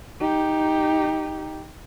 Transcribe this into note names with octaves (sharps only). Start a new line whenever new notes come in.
D#4 G4